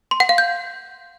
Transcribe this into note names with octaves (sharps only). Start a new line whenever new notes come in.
C6
F#5
F5
G6